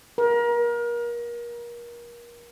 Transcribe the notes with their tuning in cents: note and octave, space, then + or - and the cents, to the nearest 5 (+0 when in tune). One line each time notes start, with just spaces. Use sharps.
A#4 +30